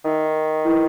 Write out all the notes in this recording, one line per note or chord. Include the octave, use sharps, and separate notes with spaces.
D#3 D#4 A#4 E5
E4 G#4 B4 G5 C#6